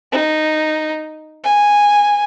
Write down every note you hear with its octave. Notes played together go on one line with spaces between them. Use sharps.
D#4
G#5